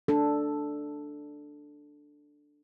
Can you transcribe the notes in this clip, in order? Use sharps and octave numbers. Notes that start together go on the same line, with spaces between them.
D4 A4